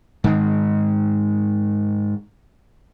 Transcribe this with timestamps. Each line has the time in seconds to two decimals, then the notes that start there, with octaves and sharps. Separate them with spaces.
0.24 G#2 D#3 G#3